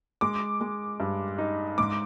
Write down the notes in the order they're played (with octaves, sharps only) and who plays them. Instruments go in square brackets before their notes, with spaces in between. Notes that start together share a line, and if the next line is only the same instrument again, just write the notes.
[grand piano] G#3 [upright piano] D6
[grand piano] G#3
G2
D#4
[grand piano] G#2 [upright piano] D6